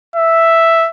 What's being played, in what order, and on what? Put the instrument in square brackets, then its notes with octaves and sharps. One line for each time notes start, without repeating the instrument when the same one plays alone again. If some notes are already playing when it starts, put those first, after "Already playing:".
[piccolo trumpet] E5